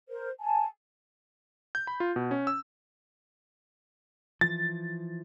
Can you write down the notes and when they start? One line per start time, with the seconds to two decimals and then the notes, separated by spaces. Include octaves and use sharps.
0.09 A#4 C5
0.40 G#5 A5
1.75 G6
1.87 B5
2.00 F4
2.16 B2
2.31 C#4
2.47 E6
4.41 E3 F3 A6